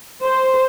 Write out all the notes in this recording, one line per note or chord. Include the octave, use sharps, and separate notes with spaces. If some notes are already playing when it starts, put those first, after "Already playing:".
C5